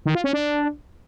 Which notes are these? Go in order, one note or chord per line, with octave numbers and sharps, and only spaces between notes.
D#3
F4
C#4
D4